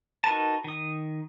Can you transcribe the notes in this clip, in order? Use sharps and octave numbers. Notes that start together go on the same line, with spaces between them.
D#4 F#4 A#4 B4 A5
D#3 D#6